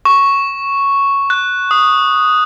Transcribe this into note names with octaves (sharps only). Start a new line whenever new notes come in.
C#6
F#6
D#6